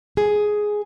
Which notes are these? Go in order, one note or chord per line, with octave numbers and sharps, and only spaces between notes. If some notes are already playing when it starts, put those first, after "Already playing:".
G#4